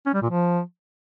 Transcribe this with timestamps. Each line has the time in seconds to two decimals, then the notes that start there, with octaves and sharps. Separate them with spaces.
0.06 C#4
0.14 G3
0.22 A#2
0.30 F3